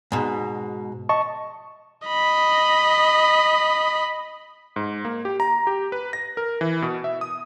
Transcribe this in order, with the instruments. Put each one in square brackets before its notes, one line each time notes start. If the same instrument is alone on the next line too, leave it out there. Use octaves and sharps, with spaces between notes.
[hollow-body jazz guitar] G#2 B2
[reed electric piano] D#5 A5 C#6
[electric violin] D#5 B5
[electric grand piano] G#2
A#3
G4
A#5
G4
B4
A#6
A#4
E3
B2
E5
D#6